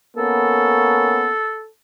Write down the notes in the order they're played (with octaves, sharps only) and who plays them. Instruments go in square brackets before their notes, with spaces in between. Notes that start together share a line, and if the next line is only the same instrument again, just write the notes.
[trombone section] A#3 B3 C#4 [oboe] A4